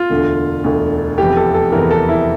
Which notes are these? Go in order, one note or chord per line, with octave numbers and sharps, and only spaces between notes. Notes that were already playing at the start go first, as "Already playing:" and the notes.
Already playing: F4
E1 D2 D3
E1 D2 D3
F1 E2 E3 G4
A4
A4
F1 E2 E3 A#4
A4
E4